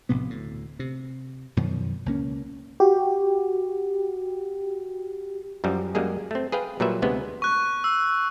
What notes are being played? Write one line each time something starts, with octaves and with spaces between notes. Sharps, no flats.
A#1 A2 C3 B3
D2 A2
C3
F#2 B2 D#3 F3
C#2 A#3 C#4
F#4 G4
F#2 F3 G3
F#2 G3 G#3 A#3 G#4
A3 C4
G#4 B4 F5 G5
A#2 F#3 G3 B4 E5
D2 C3 G#3 B3
C#6 F#6
E6